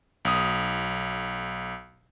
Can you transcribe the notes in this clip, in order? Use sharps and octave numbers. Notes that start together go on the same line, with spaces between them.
B1 D#6